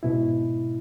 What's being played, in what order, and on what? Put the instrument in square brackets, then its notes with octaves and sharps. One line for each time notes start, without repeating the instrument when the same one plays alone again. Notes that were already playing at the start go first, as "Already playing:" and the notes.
[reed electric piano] G#2 B2 E4